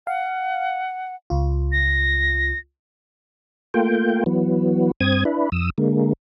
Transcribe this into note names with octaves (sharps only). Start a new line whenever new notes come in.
F5 F#5
C#2 F4
A#6
A3 A#3 F4 G5
E3 F#3 B3
G2 C4 D#6 G#6
D4 E4 B4
F2 D#6 E6
D3 G#3 A#3